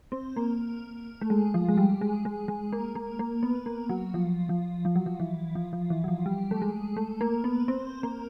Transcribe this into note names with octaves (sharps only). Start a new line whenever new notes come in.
C4
A#3
A3
G#3
F3
G#3
G3
G#3
G#3
G#3
A#3
A#3
A#3
B3
A#3
F#3
F3
F3
F3
F#3
F3
E3
F3
F3
E3
F#3
F3
G3
A3
G#3
A3
A#3
B3
C4
A#3